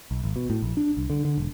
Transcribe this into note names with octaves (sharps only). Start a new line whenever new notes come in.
B1
G#1
B2
A2
A#1
D4
C2
D3
D3
E1